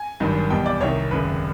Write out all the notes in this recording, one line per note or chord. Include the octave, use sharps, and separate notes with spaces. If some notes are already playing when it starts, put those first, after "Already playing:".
Already playing: G#5
G#1 G2 D#3 F#3
E2 B2 G3 G5
D5
C2 C3 D#3 C#5
G#1 F#2 C#3 B4